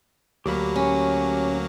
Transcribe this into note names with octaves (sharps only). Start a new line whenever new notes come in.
D2 F#3 A#3 G4 B5
C#4